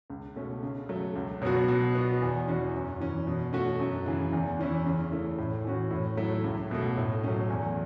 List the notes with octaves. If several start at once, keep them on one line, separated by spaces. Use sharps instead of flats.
C#2
B2 A3 C#4
C#3
F#3 A3
C#2
B2 F#3 B3 F#4
B2
B3 F#4
E2
E3 C#4 F#4
F#2
E3 C#4
B2
A3 C#4 F#4
F#2
C#3 E3
E2
E3 C#4 E4
C#3
A3 E4
A2
E3 C#4 F#4
A2
F#3 A3 E4
C#2
B2 A3
A2
F#3 A3 C#4
E2